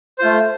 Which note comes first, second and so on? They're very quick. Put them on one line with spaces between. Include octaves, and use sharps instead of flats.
C5 F4 A3